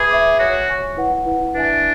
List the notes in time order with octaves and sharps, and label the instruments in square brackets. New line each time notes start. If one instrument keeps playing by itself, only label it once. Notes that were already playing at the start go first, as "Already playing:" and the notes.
Already playing: [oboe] G#4 [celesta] B4 E5 B5 D6
[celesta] B4 E5 B5 D6
[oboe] F#4 [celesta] C#5 G#5 C#6
[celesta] C#5 G#5 C#6
E4 B4 F#5
E4 B4 F#5
[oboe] D4 [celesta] E4 B4 E5 G#5